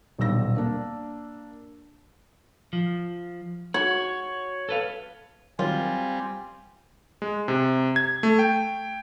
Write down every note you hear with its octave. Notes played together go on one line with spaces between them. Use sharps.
D#1 B1 D3 G3 E6 A#6
A#3 D4
F3
F#4 C#5
A4 B4 F5
D#3 F#3 G3 C4 F4 G#5
G#3
C3
G#6
A3
G5